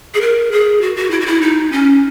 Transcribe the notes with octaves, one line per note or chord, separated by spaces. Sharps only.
G#4
A#4
G#4
F#4
F#4
E4
F#4
E4
D#4
C#4